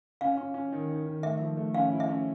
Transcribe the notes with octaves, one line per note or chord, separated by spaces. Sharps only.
C#4 F5
C#4
C#4
D#3
D#3
D#3
A3 E5
F3
A3
C#4 F5
E4
E5
C#4